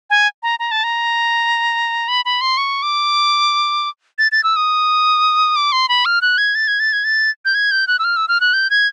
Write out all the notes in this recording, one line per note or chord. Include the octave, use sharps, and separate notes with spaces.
G#5
A#5
A#5
A5
A#5
B5
B5
C6
C#6
D6
A6
A6
E6
D#6
D6
C6
B5
F6
F#6
G#6
A6
G#6
A6
G#6
A6
G6
G#6
G6
F#6
E6
F6
E6
F6
F#6
G6
G#6